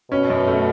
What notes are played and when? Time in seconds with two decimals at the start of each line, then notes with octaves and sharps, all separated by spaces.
0.11 B2 C#4
0.30 F#2
0.47 A3